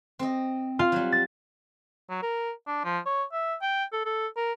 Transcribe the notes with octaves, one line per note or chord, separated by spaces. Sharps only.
C4 D#5
F4 F5
F#3 G3
A6
F#3
A#4
D4
F3
C#5
E5
G5
A4
A4
A#4